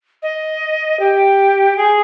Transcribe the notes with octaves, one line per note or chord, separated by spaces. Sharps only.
D#5
G4
G#4